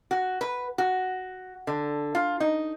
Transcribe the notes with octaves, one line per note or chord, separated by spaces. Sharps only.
F#4
B4
F#4
D3
F4
D#4